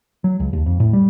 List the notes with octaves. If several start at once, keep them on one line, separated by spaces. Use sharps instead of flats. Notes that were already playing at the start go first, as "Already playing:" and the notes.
F#3
C#2
D#2
F2
A2
G3